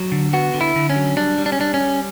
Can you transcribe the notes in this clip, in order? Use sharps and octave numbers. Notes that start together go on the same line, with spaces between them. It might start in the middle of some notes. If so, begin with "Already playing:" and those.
Already playing: F#3
D3
B3 F#4
D3
E4
D3
C#4
F#3
G3 D4
G3
D4
C#4
G3 D4
C#4
G3